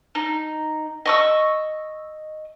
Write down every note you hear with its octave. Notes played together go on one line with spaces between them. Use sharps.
D#4
D#5 C#6 E6